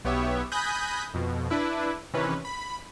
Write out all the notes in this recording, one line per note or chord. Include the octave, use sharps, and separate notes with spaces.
B1 B3 G4 C#5 E5
G#5 B5 D#6 F#6 G6 A#6
F2 B2
D4 E4 B4
C3 D#3 E3 C#4 B4
B5